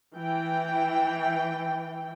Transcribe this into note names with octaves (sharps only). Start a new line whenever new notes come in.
E3 G5